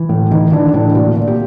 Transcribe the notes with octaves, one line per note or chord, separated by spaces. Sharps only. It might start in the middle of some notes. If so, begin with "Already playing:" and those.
Already playing: E3
A2
E3 D#4
E3 D4
A2 D4
A#2 F#4
A#2
G4